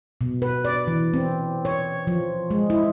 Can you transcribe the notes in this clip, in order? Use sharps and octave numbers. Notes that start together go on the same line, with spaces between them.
B2
B4
D5
E3
C4
C#5
F3
G#3
E4